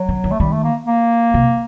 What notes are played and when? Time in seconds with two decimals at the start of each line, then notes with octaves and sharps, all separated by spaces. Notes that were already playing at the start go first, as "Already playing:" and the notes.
Already playing: F#3
0.09 D3
0.24 D#3
0.31 A3
0.40 D#3 G3
0.52 A3
0.64 A#3
0.87 A#3
1.34 C3